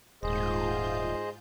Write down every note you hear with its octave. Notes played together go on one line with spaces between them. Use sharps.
D#1 G#2 F4 G#4 C5 D#5 G6